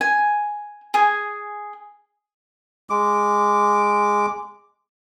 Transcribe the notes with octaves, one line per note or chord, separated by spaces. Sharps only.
G#5
G#4 G#5
G#3 D6